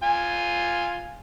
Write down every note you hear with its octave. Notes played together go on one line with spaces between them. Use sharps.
F4 G#5